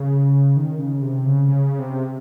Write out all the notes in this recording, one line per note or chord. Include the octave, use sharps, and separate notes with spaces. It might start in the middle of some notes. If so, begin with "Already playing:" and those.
Already playing: C#3
D#3
C#3
C3
C#3
C#3
C3